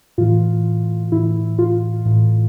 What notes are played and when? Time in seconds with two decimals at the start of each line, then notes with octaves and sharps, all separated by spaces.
0.18 A2 E3 F4
1.12 A2 E3 E4
1.59 F4
2.05 A2 E3